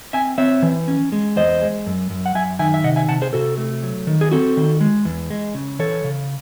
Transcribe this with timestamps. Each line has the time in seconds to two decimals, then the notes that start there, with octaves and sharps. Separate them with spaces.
0.13 C4 E5 G#5
0.38 C4 C#5 E5
0.62 E3
0.88 C#4
1.12 G#3
1.36 E2 C5 D#5
1.62 G#3
1.86 F#2
2.10 F#2
2.26 F#5
2.35 F#2 E5 G#5
2.59 D#3 E5 G#5
2.74 E5
2.84 C3 D#5 F#5
2.96 E5 G#5
3.09 C3 F#5 A5
3.22 G#4 C5
3.33 C3 F#4 A4
3.58 A3
3.83 F#3
4.07 D#3
4.21 G#4
4.31 C4 F#4 A4
4.57 D#3
4.81 G#3
5.05 E2
5.30 G#3
5.54 C#3
5.79 E3 A4 C#5
6.04 C#3